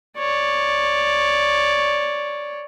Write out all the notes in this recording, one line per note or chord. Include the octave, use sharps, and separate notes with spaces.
C#5 D5